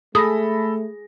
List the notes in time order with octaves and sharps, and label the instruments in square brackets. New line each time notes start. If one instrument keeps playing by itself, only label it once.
[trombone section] A3 [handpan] G#4 [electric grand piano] A4 B5 A#6 [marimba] D#6